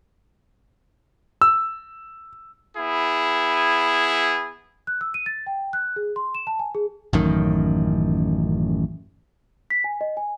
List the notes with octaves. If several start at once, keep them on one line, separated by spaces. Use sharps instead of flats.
E6
B3 E4 G#4
F#6
E6
D#7
A6
G5
F#6
G#4
C6
E7
A5
G#5
G#4
A1 F#2 D#3
B6
G#5
D#5
G#5